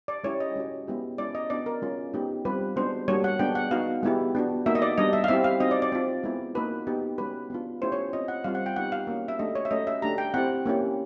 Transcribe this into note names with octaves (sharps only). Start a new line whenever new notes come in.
D5
G#3 C#4 E4 G4 C#5
D#5
G#3 C#4 F#4
G#3 B3 E4 G4
G#3 C#4 E4 D5
D#5
B3 D4 F#4 D5
A#4
G#3 C#4 F4
G#3 B3 D#4 G4
G3 C4 F4 B4
G#3 B3 D4 F#4 C5
G3 A#3 D4 F#4 C#5
F#5
G#3 B3 D4 G5
F#5
B3 D#4 F#4 F5
G#3 B3 E4 G4
B3 D4 F#4
A#3 D#4 F#4 E5
D#5
D5
G3 B3 D4 D#5
E5
F5
C4 E4 G4 E5
F5
C4 D#4 F#4 D#5
D5
D5
C4 F4
G#3 B3 E4
A#3 D#4 F#4 B4
B3 D#4 G4
G#3 C#4 F#4 B4
B3 D4 F4
A3 C#4 E4 G4 C5
C#5
C4 F4 D#5
F#5
G3 C4 F4 F5
F#5
G5
B3 D#4 G4 F#5
F5
A#3 C#4 F#4
E5
A3 D4 G4 D#5
C#5
E5
A3 C#4 F#4 D#5
E5
A3 D4 G4 A#5
G5
C4 E4 G4 F#5
A#3 C#4 E4 G4